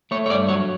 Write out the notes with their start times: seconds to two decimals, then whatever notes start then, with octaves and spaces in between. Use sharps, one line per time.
0.11 A3 C#5
0.26 C#5
0.30 G2 D5
0.49 F#3 C#5